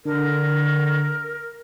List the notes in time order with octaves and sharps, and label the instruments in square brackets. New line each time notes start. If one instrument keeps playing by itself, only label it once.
[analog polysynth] D3 [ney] A#4